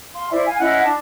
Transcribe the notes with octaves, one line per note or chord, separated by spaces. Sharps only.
F5 C6
E4 C5 D5 E5
F5 G#5
C#4 E4 D#5 F#5
D4 A5